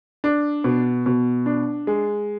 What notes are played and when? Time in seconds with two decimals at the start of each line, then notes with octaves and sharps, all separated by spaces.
0.24 D4
0.64 B2
1.06 B2
1.46 D4
1.87 G#3